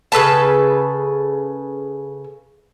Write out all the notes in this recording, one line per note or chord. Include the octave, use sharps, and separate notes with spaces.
C#3 A4 B4 A5